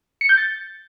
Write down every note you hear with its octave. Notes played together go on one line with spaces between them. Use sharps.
C#7
G6
A6